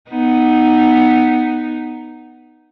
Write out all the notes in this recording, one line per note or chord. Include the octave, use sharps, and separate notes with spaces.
B3 D#4